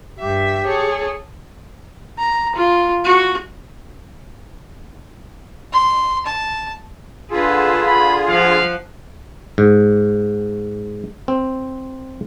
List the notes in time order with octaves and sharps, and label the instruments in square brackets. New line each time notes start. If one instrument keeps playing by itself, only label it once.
[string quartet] G2 E5 [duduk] G4
[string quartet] G#4 A4 C#5
[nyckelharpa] A#5
F4
F#4
[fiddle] C6
A5
[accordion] D3 F4 G#4 [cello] A4 B4
[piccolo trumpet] B5
[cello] F3 F#5 [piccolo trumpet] F5
[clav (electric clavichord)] G#2
C4